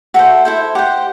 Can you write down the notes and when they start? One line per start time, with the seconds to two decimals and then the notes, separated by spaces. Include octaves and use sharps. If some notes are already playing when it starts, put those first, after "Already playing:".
0.14 F#4 A4 C5 E5
0.45 E4 A4 C5
0.75 G4 C5 F#5